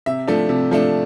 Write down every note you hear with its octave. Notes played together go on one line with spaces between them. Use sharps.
C3 E5
F3 A3 D4
C3
F3 A3 D4